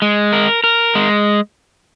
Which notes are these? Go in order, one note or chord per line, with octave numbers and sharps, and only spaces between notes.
G#3
A#4
A#4
G#3